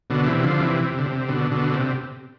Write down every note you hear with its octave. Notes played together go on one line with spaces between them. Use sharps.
B2 D3
C3 E3
D3 F3
C3 E3
C3
D3
C3
B2 D3
B2 D3
C3